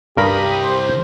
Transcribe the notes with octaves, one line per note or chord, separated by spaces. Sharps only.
C2 G2 G4 A#4 B5 D#6 A#6 B6
C5